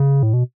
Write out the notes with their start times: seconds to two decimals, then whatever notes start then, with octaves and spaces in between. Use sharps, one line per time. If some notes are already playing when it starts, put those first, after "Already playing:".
Already playing: C#3
0.23 A2
0.33 B2